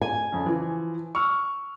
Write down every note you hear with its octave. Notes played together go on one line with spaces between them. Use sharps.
G#5
F2 C#3
E3 F3
C#6 E6 F6